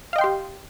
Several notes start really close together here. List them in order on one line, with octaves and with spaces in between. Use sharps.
F5 D#5 G5 C6 G4